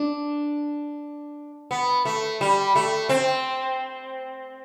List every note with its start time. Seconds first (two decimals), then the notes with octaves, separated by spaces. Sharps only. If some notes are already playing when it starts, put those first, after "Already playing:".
Already playing: D4
1.71 B3
2.05 A3
2.41 G3
2.76 A3
3.09 C4